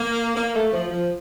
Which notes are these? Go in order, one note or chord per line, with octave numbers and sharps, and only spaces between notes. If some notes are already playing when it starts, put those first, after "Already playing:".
Already playing: A#3
A#3
A3
F3
F3